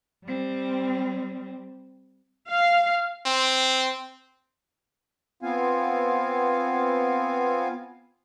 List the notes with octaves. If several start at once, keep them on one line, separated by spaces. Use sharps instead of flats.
G3 C4
F5
C4
B3 C4 F4 F5 G#5